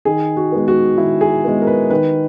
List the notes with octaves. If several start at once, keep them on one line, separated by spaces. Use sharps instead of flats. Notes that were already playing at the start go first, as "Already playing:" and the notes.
D#3 G#4
F#4
G#3 B3
F#4
D#3 E4
G#4
G#3 B3
A#4
B4
D#3 B4